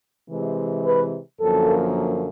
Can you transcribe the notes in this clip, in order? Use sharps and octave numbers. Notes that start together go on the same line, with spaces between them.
C3 E3 G#3
B4
F#2 D3 F3 A#3 A4